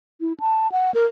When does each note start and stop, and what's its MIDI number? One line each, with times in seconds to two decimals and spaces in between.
0.21 0.33 64
0.40 0.70 81
0.72 0.91 78
0.94 1.05 70